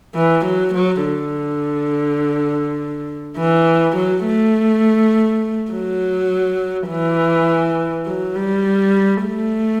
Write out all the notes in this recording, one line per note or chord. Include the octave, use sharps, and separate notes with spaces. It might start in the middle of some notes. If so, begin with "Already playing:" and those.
E3
F#3
F#3
D3
E3
F#3
A3
F#3
E3
F#3
G3
A3